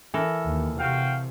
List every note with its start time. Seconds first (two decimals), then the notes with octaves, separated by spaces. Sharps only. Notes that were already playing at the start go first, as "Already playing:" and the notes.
0.14 E3 A4 A#4
0.45 D#2
0.78 C3 F#4 F5 G5